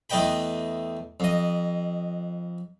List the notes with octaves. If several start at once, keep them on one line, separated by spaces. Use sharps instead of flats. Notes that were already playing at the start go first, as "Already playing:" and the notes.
E2 A3 B4 D#5 G5 B5
F2 D#5